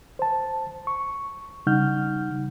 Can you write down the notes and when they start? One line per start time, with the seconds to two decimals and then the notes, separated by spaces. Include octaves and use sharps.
0.19 C5 A5
0.87 C#6
1.67 C#3 G3 D#4 F#5 F6 G6